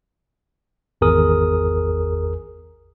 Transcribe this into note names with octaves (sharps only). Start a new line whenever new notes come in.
G#1 E2 G#4 A#4 D#6